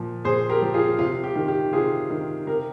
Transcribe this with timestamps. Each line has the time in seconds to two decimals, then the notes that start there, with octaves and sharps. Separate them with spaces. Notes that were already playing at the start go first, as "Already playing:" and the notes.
Already playing: A#2 F3
0.25 A#2 G#4 C5
0.49 G4 A#4
0.62 F3
0.74 F4 G#4
0.99 C3 F4
1.24 G4
1.35 D#3
1.48 G4
1.73 C3 F4 G#4
2.10 D#3
2.47 C3 G4 A#4